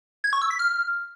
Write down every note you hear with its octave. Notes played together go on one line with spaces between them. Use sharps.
G#6
C#6
E6
B6
F6